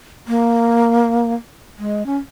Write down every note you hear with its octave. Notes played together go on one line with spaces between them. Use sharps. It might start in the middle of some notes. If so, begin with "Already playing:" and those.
A#3
G#3
C#4